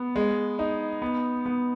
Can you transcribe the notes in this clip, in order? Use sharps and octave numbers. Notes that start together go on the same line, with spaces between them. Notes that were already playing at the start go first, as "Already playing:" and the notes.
Already playing: B3
G#3
D#4
B3
B3